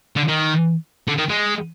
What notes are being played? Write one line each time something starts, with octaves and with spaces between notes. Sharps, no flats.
D3
D#3
D3
D#3
G#3